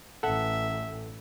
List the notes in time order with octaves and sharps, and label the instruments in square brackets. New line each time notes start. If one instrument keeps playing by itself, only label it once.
[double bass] A1 [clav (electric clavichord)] A4 F#5 [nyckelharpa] E5